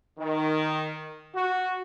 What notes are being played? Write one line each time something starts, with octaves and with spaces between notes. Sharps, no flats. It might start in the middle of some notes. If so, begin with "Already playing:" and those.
D#3
F#4